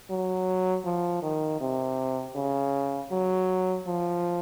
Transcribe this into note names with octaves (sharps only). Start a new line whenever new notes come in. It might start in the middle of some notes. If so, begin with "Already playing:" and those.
F#3
F3
D#3
C3
C#3
F#3
F3